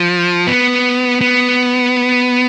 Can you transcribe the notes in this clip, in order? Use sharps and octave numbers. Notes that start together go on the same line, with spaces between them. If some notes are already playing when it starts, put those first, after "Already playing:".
Already playing: F3
B3
B3